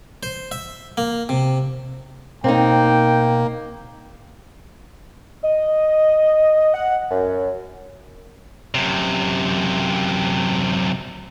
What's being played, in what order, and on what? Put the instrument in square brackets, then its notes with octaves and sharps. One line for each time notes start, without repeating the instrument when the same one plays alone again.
[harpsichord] C5
E5
A#3
C3
[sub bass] B2 [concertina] A#3 [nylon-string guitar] C4 D#4 [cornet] G5
[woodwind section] D#5
F#5
F#2
[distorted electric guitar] F#2 C3